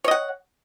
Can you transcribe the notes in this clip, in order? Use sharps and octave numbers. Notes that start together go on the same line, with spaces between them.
C#5 D#5 F#5